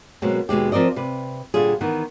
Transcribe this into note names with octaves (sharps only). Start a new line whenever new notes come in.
B2 F#3 G#3 A#3 C4
D#2 B2 G#3 G4
F3 C4 A#4 D5 D#5
C3 B4
A#2 D3 G3 F4 G#4
D#3 E3 B3